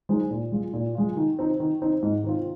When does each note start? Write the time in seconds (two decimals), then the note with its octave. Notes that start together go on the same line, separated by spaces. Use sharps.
0.09 G#3 D#4 C5
0.30 A#2
0.52 G#3 F4
0.73 A#2
0.95 G#3 F4
1.16 D#3
1.39 C4 D#4
1.60 D#3
1.82 C4 D#4
2.02 G#2
2.24 D#3 C4 F4